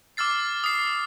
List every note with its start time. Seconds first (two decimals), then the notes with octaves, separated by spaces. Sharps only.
0.17 D6 E6 F6 A6 C7
0.64 D#6 C7